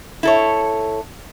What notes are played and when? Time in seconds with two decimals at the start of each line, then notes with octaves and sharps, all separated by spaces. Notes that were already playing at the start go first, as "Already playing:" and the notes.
0.23 E4 A4 C#5